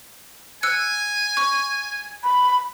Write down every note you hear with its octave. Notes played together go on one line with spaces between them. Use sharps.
G#5 E6 F#6 C#7
C#6
B5